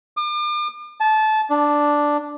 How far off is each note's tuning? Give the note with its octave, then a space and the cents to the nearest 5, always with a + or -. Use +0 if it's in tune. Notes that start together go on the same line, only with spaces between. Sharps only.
D6 +45
A5 -20
D4 +0